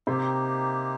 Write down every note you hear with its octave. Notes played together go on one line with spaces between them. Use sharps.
C3 A#3 D#4 G4